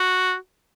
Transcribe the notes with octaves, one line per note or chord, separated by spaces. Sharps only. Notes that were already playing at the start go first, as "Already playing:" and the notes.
Already playing: F#4